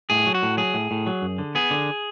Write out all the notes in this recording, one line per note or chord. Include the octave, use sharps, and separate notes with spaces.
A2 G#4
F#3
F#4
A2
F#3 G#4
A2
A2
F#3
F#2
D3
B3 G#4
D3